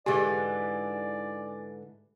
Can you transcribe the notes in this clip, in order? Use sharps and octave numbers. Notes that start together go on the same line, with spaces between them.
G#2 D3 E3 G4 G#4 D5 G#5